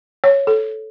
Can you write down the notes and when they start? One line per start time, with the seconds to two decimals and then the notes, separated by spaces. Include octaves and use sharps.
0.24 C#5
0.47 A4